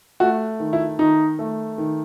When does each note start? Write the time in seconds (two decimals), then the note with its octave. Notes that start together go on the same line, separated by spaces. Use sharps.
0.20 A3 F#4
0.60 D#3
0.73 E4
0.99 D#3 D#4
1.39 A3
1.78 D#3